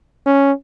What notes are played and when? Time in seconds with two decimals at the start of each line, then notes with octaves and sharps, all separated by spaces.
0.26 C#4